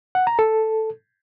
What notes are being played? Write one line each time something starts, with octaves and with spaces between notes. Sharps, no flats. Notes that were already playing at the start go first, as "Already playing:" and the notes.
F#5
A#5
A4